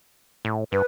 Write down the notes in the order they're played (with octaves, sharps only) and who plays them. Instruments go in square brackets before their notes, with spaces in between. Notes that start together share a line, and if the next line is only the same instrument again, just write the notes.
[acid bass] A2
[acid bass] G2 [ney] B4